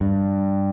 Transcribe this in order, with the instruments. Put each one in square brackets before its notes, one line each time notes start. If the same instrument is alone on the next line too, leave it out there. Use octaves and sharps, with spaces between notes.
[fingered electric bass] G2